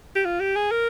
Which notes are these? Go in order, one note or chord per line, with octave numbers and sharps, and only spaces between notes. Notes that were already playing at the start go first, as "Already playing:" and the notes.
G4
F4
G4
G#4
A#4